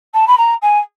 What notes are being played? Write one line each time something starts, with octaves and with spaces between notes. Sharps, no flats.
A5
B5
A#5
G#5